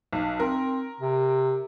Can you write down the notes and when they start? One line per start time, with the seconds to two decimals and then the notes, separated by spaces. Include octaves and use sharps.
0.13 B1
0.40 C4 A#4
1.01 C3